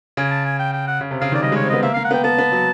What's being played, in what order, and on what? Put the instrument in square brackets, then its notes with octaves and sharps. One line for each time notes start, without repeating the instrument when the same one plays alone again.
[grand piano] C#3 [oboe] G#5
[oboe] A5
G#5
G5
G5
F#5
[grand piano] C#3
C3
[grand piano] C#3 [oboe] F5
[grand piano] D#3
[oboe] D5
[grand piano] G3 [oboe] D#5
[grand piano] G#3
[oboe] C#5
[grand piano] C4
[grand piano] B3 [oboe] D#5
[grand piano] A#3 [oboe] E5
[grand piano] A#3 [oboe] F5
[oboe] F#5
[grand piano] B3 [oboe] G5
[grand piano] B3 [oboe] A5
[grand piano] B3
F#3